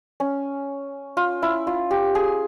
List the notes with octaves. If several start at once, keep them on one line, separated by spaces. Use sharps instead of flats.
C#4
F4
E4
F4
G4
G#4